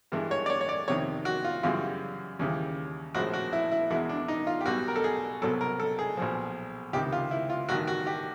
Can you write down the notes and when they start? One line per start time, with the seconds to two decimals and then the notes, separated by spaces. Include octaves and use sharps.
0.12 G2 E3 G#3
0.31 C#5
0.46 D5
0.50 C#5
0.61 C#5
0.69 D5
0.88 F2 C3 D#3 C#5
1.25 F#4
1.45 F4
1.63 F#2 C#3 E3 G3 F4
2.39 D#2 C#3 E3 G3
3.14 A#1 A2 F3 G#3 F#4
3.33 F#4
3.53 E4
3.71 E4
3.90 E2 B2 G#3 E4
4.09 D4
4.28 D#4
4.47 F4
4.61 G4
4.66 B1 B2 G3 F#4
4.88 A#4
4.96 A4
5.04 G#4
5.42 C2 B2 F#3 A4
5.61 A#4
5.80 A4
5.99 G#4
6.17 B1 A#2 F3
6.93 C#2 C3 D#3 G4
7.12 F4
7.31 E4
7.50 F4
7.69 A1 G2 D#3 F#4
7.87 F#4
8.07 G4